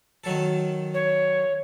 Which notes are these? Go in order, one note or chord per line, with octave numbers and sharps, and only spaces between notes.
D#3 F#3 A4
C#5